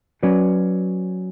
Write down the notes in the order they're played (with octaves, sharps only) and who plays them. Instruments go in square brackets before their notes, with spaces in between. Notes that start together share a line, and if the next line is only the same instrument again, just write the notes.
[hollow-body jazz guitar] F#3 C#4 F#4 B4 D5